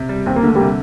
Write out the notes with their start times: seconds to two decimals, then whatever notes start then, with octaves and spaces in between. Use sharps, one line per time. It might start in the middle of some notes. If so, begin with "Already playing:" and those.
Already playing: C3
0.09 G3
0.26 D#2 C4
0.36 A#3
0.43 D3 A3
0.55 C3 G3 A#3